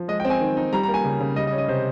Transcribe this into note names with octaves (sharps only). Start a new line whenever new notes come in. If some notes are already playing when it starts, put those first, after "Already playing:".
Already playing: F3
G#3 D#5
G5
C4
G#5
D#3
D#4
G3 A#5
A#5
A#3
G#5
C#3
C#3
G3 D#5
D#5
C#4
D#5
C3 C5